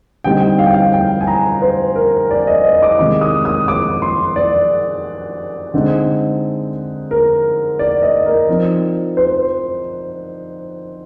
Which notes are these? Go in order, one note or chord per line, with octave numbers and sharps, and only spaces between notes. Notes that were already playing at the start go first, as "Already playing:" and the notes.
D3 G3 C4 D#4 G5
F5
G5
F5
G5
G#5
A#5
C5
A#4
D5
D#5
D#5
D6
C3 D#3 G#3 D6
D#6
D#6
D6
C6
D5
D3 G#3 C4 D#4
A#4
D5
D#5
A#4
F3 C4 D#4
C5